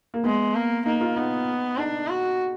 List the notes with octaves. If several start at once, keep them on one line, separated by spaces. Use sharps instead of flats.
A#3
G#3 B3
A#3
A#3 D#4
F4
B3 D#4
D4 D#4
F#4